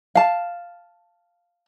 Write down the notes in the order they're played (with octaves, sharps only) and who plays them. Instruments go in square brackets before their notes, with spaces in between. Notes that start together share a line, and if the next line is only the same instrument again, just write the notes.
[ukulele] F5 A5